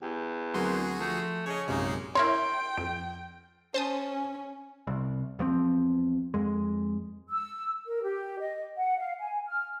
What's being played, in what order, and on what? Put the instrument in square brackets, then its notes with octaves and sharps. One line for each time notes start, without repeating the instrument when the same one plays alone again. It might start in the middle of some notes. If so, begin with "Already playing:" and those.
[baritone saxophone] E2 [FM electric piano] G4
[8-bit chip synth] D2 F#4 G#4 [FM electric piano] F#3 C4 A#4 [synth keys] C6
[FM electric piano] F3 [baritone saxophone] A3
[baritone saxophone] C#3 [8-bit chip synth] C#5 D#5
[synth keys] A#1 F#2 C3 [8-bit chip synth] G#3 A#3 D#4
[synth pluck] E4 A#4 C#5 [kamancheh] G5 [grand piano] C6
[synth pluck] F2 [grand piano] D7
[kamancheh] C#4 [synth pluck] C5 A5 D#6
[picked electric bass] C2
E2 F3 G3 C4
F2 G#3
[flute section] E6
A#4
G4
D#5
F#5
F5
G#5
F6